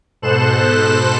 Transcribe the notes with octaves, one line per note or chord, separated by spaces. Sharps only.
G#2 B2 A4 C5 F#6 E7